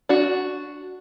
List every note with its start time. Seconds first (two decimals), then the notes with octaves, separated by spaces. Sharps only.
0.09 D4 F#4